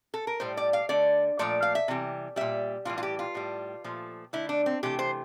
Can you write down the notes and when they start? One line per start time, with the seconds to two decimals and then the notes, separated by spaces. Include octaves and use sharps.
0.14 A4
0.27 A#4
0.40 A2 G3 C5
0.57 D5
0.73 F5
0.89 D3 A3 D5
1.39 A#2 F3 A3 D5
1.62 F5
1.75 E5
1.88 C3 E3 G3
2.36 A#2 G3 E5
2.85 A2 E3 G3 F4
2.98 F4
3.03 G4
3.19 F4
3.35 A2 G3
3.84 A#2 F3 A3
4.33 D3 A3 E4
4.49 D4
4.66 C4
4.83 C3 E3 A3 G4
4.99 C5